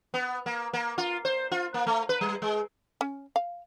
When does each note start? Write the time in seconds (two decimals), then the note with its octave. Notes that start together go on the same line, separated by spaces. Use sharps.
0.14 B3
0.46 A#3
0.73 A#3
0.98 F4
1.25 C5
1.52 F4
1.74 A#3
1.87 A3
2.09 B4
2.21 G3
2.42 G#3
3.01 C#4
3.36 F5